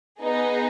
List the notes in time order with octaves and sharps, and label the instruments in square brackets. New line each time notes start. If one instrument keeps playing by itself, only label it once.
[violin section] B3 D#4 G#4